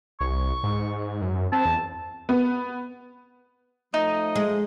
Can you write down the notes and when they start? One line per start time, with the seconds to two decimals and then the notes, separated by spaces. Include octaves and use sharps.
0.21 C2 C#6
0.63 G#2
1.22 F#2
1.52 C4 A5
1.65 E2
2.29 B3
3.94 F3 A3 D#4 D#5
4.35 G#3